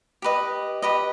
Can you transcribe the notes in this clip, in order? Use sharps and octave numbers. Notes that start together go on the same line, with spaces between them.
G4 B4 D#5
G4 B4 D#5